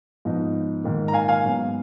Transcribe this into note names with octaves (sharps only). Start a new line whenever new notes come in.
G#2 F3 B3 D#4
G#2 D#3 A#3
A#5
F5 G#5
F5 G#5
G#2 F#3 B3